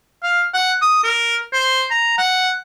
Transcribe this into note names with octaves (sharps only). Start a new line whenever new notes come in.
F5
F#5
D#6
A#4
C5
A#5
F#5